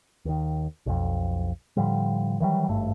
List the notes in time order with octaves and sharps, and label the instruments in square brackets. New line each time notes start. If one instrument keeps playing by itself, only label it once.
[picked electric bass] D#2 D#3
B1 F2
A2 D3 F3 G3
D#3 E3 F#3 G3
G#1 G2 A3